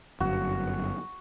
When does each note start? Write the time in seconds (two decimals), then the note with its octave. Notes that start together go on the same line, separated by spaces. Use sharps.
0.20 G1 F#2 F#4